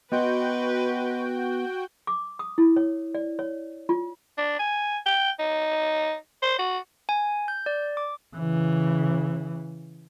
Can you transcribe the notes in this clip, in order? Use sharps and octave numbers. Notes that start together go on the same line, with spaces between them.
B3 F#4 B4 D#5 G5 C6 G6
D6
D#6
E4
C#5
D5
C#5
F4
D4
G#5
G5
D#4
C5
F#4
G#5
G6
D5
D6
C#3 E3